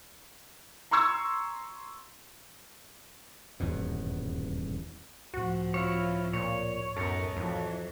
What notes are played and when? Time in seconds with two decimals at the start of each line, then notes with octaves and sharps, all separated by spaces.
0.91 A#5 C6 C#6 E6 G#6
3.60 D#1 E2 G2 B2
5.34 C#2 A2 F3 C4 F#4
5.74 E4 F4 C#5
6.33 A#2 C#5
6.97 F#2 B3 D#4 A4 A#4 C#5
7.37 F2 E3 F#3